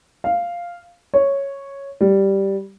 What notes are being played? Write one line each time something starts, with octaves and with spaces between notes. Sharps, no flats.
F5
C#5
G3